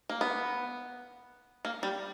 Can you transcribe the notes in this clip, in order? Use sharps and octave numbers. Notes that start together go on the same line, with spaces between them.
A#3
B3
A#3
G3